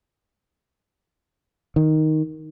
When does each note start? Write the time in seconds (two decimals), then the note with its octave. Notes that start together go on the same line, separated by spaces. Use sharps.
1.76 D#3